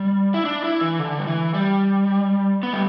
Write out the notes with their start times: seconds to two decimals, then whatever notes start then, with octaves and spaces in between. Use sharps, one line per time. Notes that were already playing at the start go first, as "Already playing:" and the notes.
Already playing: G3
0.34 E4
0.45 D4
0.64 E4
0.81 E3
0.99 D3
1.19 G3
1.27 E3
1.54 G3
2.63 B3
2.73 G3